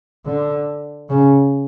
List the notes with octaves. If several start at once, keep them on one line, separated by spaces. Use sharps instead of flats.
D3
C#3